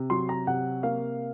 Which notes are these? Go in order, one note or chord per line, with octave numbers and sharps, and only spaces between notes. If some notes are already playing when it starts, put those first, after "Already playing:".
Already playing: C3
F#3 C6
A#5
C3 F#5
A#3 F5